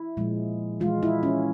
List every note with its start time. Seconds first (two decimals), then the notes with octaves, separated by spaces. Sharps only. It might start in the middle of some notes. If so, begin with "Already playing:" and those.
Already playing: E4
0.17 A#2 F3 G#3
0.80 E3 G#3 F4
1.03 E4
1.23 C#4